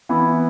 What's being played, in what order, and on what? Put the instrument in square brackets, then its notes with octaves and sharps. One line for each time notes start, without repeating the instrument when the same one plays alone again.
[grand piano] E3 B3